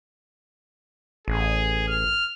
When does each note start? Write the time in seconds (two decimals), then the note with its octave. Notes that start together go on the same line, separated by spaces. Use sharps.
1.28 A1 G#4
1.89 F6